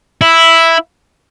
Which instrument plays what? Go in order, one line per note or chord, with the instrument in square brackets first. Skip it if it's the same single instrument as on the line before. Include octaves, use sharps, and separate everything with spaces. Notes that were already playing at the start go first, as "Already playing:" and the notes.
[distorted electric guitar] E4